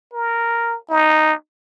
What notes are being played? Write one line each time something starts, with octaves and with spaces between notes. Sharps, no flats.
A#4
D#4